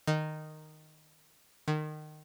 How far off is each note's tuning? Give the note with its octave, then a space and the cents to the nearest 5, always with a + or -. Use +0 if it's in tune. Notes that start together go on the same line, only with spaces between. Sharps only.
D#3 -10
D#3 -25